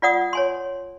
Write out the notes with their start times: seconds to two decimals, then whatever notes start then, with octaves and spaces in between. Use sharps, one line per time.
0.02 F4 D5 F#5 D#6
0.33 C#5 G#5 C6